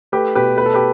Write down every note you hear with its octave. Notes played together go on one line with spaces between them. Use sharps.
A3 G4 B4
B2 G4 B4
A3 B4
A4
G4 B4